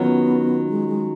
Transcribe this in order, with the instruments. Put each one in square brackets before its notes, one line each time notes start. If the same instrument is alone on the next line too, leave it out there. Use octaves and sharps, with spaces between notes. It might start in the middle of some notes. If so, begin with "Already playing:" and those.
Already playing: [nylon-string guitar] D#3 F#3 C#4 F4 [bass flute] B3
[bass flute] G#3
G#3